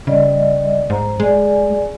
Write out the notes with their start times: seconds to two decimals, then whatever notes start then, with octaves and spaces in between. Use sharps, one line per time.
0.07 C#3 G3 D5 D#5
0.90 G#2 C5 A#5
1.20 G#3 G#4 D5 G#5